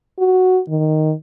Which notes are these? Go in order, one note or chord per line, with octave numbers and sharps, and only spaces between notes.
F#4
D#3